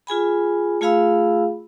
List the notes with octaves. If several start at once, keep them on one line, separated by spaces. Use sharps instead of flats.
F4 G#4 G#5 B5
A3 F4 G#4 F5 B5 E6